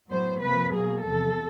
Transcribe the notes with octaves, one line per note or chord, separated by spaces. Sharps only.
A2 F#3 B3 C5
C3 F3 A#3 B4
B2 F#3 A#3 G#4
E2 C3 F3 A4